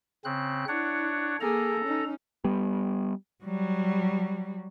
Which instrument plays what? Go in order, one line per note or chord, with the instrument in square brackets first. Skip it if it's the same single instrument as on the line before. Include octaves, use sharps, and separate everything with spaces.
[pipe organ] C#3 C4 F#6
[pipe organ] D4 C#5 F#5 [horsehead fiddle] E4
[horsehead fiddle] A#3 G#4 [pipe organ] A4 A#5
[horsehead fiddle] C#4 D#4
[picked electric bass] G3 B3
[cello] F#3 G3